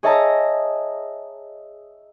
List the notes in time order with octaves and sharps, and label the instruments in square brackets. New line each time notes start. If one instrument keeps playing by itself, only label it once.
[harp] G#4 C#5 D#5 E5 A5 A#5